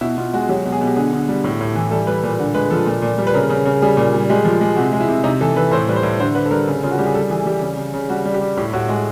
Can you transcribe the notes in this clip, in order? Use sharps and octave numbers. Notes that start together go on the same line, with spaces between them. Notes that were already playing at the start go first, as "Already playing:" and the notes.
B2 E4
B2 F4
G#3 F#4
F#3 G4
B2
G#4
B2
G4
D3 G#4
D3
G3
A2 G4
A2
E3
G3 A4
G3 B4
A#2
D3
G#3 B4
F3 A4
A#2
A#2
G3
B4
C#3 A#4
C#3
C#3
G3 G#4
A#2
G3
G#3 G4
F3
G#3
C3 F#4
G#3
E4
C3
C3 D#4
E3 A4
E3 B4
A2 C5
G3 B4
C5
A2
D3 C5
D3 B4
A4
G3 A#4
C#3
C#3 F4
F#4
G3 G4
G#4
G3 A4
E3 G#4
G3 G4
C#3
C#3
C#3
G3 F#4
G3
G4
G3
A2 G4
A2 F#4
G#3 F#4